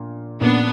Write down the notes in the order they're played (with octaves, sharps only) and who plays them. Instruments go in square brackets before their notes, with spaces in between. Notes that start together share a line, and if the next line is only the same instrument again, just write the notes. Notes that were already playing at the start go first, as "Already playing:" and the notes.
Already playing: [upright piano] A#1 A#2 A#3
[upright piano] A#1 A#2 A#3 C#4 [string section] B3 D4